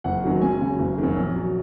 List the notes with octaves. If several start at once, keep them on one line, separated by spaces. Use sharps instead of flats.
F#1 F#5
F#2 D#3 F#3
C#2 G#5
C#3 F#3
F#1
F#2 D#3
A#1
F#3